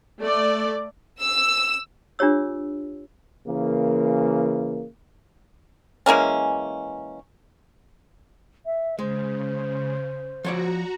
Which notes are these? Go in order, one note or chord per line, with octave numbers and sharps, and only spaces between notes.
A3 D5
E6
D4 F4 G4 C#5 E6
C#3 E3 A#3
E3 G#3 A#3 C#4
E5
C#3 G#3 C5
F3 F#4 C#5 D5 A#5